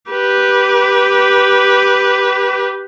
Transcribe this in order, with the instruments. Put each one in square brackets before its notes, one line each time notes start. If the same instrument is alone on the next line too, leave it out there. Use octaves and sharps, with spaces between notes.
[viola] G4 B4